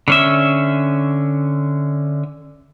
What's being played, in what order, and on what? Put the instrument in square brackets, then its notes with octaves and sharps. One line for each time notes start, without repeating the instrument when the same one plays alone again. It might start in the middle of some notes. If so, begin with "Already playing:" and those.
[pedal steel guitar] D3 C#4 E5